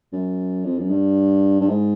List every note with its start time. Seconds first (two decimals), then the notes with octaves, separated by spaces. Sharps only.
0.13 F#2
0.65 F2
0.78 F#2
0.91 G2
1.61 G2
1.70 G#2